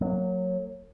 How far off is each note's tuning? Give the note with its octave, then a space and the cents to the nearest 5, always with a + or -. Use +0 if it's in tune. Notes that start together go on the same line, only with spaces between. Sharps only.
F#3 -15 A#3 -40